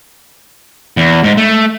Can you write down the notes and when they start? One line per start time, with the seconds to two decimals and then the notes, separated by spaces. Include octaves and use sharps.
0.97 E2
1.24 G#2
1.37 A3